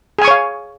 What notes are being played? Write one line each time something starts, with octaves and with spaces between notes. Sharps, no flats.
G#4 C#5 F5 G#5 C#6